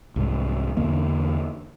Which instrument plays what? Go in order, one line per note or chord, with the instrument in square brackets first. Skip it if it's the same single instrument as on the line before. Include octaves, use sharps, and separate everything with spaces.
[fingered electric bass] C2 G#2
E2 D3 A#3